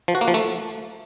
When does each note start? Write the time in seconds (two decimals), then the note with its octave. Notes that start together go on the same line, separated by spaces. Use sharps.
0.08 F3
0.15 F#4
0.21 A#3
0.28 F3
0.34 A3